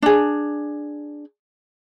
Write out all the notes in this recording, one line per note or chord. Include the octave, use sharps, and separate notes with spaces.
D4 G#4